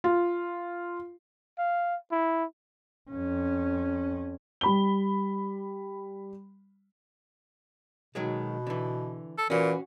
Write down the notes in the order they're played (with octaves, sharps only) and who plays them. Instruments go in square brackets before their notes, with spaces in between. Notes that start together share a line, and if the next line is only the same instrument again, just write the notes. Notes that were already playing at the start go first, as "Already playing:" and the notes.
[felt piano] F4
[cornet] F5
E4
[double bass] F2 C#4
[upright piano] G3 B5 G7
[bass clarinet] B2 [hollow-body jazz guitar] D#3 F#3 G#3
[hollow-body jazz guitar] D3 E3
[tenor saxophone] A4
[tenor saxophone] A#2 [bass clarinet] E3 [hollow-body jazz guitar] C#4 F#4